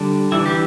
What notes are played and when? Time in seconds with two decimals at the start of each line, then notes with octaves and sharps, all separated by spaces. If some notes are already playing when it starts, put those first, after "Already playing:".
Already playing: D3 G3 D4
0.32 E3 G3 D4 E4
0.46 G4